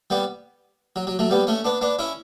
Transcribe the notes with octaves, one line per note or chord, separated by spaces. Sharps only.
G3 B3
F#3
F#3
F#3 A3
G3 B3
A3 C#4
B3 D4
B3 D4
C#4 E4